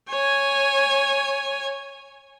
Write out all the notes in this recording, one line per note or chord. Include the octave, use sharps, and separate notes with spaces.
C#5 G#5